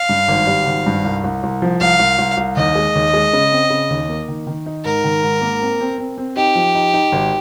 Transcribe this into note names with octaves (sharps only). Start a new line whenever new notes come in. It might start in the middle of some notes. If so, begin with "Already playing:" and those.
Already playing: F5
G2
G#1
G3
G#1
G2
C2
C2
C2
F3
C2 F5
C2
C2
C2
D#2 D#5
G#3
D#2
G#3
C#3
C4
C#3
D#2
A#3
D#3
D#3
D#4
G#2 A#4
D#3
G#2
A#3
C4
C4
C4
C4
D#4 G4
F3
D#4
D#4
G#1